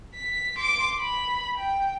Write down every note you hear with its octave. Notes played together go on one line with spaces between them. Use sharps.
B6
C6 D6
B5
G5